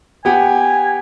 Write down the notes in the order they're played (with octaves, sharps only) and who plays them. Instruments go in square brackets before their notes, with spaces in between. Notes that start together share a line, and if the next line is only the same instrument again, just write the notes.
[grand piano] B3 G4 F#5 [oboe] G#5